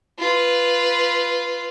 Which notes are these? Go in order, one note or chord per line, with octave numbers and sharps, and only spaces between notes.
F4 B4